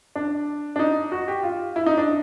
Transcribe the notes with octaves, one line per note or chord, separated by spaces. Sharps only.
D4
D4
D#4
F#4
G4
F4
E4
D#4
D4